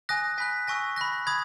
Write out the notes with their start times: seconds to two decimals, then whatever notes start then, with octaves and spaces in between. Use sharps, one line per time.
0.09 G#5 D#6 F#6 A#6
0.38 G#5 B5 F#6 B6
0.67 G#5 C#6 E6 A#6
0.96 B5 F#6 A#6
1.27 B5 D#6 G#6